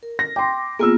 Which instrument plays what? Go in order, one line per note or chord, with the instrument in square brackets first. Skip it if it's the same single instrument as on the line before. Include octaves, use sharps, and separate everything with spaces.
[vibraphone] A#4
[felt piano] A#6
[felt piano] G5 C6 [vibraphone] D6
[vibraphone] A#3 B3 F4 [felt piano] G#4 E6